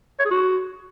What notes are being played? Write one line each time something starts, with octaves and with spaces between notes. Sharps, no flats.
C#5
G#4
F#4